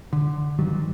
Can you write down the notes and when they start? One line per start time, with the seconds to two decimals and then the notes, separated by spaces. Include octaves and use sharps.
0.13 D3
0.59 G2 D#3 F#3 G3